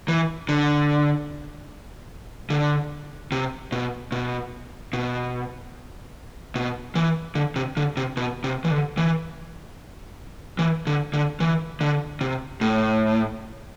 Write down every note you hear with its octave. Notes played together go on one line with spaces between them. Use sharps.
E3
D3
D3
C3
B2
B2
B2
B2
E3
D3
C3
D3
C3
B2
C3
E3
D3
E3
E3
D3
D3
E3
D3
C3
A2